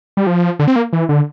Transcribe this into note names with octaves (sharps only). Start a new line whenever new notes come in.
G3
F3
D3
C4
A#3
E3
D3